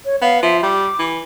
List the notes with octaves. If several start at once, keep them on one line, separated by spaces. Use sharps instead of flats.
C#5
B3 F5
F3 E5
G3 D6
E3